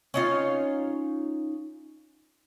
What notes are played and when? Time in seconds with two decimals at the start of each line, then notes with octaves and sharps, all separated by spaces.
0.14 C#4 D#4 F4